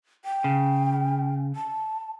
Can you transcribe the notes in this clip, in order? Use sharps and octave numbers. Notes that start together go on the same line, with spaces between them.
G5
C#3
A5